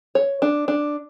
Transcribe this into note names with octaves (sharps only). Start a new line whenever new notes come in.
C#5
D4
D4